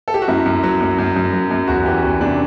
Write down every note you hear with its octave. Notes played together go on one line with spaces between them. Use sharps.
A4
G4
F#4
F#2 E4
F#2
F#3
F#2
F#2
F#2
F#3
F#2
E2 F#4
E3 G4
E2 F#4
C3 D4